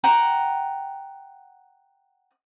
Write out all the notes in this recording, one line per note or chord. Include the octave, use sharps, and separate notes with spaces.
F#5 G5 A#5